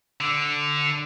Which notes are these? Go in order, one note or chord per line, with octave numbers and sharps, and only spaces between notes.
D3